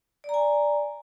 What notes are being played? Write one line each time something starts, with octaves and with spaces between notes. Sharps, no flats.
D5 G#5 A#5